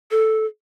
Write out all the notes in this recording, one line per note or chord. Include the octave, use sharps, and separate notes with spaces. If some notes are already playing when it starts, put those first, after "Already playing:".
A4